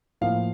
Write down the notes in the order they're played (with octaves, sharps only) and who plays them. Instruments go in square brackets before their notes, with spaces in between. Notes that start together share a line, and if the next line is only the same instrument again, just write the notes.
[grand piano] A2 F3 A#3 F5